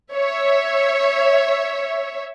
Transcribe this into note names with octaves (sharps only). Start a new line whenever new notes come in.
C#5 E5